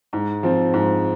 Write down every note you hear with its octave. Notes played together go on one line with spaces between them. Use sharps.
G#2
F3 C4
G#2